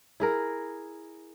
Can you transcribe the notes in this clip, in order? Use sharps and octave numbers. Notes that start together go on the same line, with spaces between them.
E4 G#4 A#4